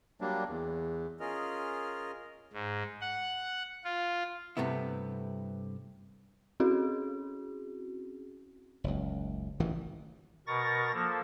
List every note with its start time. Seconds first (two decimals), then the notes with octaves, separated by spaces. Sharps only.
0.21 F#3 G3 A#3 D4
0.49 E2
1.20 C#4 F4 G#4 A#4 D#5 F6
2.53 G#2
3.01 F#5
3.85 F4
4.57 G2 C3 A3 B3 E4
6.60 C4 C#4 E4 F#4 G#4
8.84 F#1 C#2
9.60 A1 D#3 E3
10.47 B2 A#4 C#6 A6 A#6
10.93 F3 A#3 A4